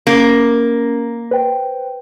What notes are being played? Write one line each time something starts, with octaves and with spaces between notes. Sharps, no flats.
A#3 C#4
B4 C5 G5